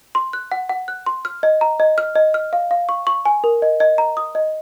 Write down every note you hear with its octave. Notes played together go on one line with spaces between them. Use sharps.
C6
F#6
F#5
F#5
F#6
C6
F6
D#5
A#5
D#5
F6
D#5
F6
F5
F5
C#6
C#6
G#5
A#4
D#5
D#5
A#5
D#6
D#5